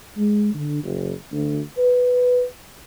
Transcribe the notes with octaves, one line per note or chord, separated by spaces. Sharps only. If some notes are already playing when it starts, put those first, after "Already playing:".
G#3
D3
F#1
D2
B4